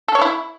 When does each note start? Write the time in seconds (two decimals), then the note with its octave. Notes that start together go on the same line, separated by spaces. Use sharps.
0.08 A4
0.15 C#5
0.22 E4